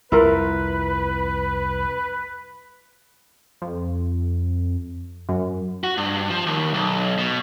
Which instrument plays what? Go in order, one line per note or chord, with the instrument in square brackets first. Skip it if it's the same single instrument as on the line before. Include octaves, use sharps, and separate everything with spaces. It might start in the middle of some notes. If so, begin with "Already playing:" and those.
[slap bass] C2 F2 [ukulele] E4 F4 A#4 [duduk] B4
[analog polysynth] F2
F#2
[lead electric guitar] F#4
G2
F3
D#2
B1
B2